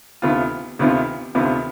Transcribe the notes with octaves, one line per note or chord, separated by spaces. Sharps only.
D2 C3 D#3 B3 F4
D2 C3 D#3 B3 F4
D2 C3 D#3 B3 F4